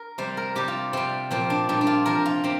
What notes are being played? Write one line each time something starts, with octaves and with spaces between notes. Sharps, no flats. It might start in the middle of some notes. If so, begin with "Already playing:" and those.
Already playing: A#4
C3 G3 C5
A#4
C3 G3 G4
F4
C3 G3 C4
A#2 F3 C4
D4
A#2 G3 D4
D4
F4
C3 F3 A#4
F4
C3 C4